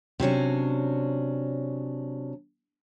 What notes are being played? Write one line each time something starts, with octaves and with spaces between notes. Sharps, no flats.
C3 F#3 C#4 D4